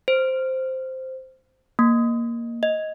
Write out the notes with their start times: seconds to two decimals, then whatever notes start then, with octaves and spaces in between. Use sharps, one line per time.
0.08 C5
1.79 A#3
2.63 D#5